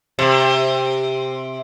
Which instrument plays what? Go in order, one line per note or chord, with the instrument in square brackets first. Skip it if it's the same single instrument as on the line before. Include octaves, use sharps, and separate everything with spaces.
[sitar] C3